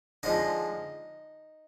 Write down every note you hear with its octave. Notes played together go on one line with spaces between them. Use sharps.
D3 F3 G#3 D#4 D#5